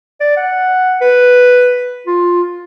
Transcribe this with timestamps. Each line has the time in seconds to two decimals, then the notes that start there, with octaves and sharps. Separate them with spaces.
0.21 D5
0.37 F#5
1.01 B4
2.07 F4